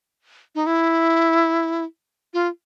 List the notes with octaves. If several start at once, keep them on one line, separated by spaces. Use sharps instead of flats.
D#4
E4
F4